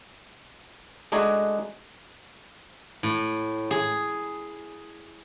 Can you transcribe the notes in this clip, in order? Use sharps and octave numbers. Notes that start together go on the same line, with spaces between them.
G#3 A3 D4 D#4 F#4 G#4
A2
G#4